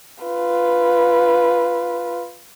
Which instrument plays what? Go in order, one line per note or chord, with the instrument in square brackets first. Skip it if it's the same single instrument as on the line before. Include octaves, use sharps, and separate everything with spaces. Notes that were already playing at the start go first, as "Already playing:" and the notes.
[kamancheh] F4 B4